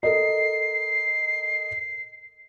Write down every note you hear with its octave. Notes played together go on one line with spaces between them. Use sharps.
A4 A#4 D#5 C7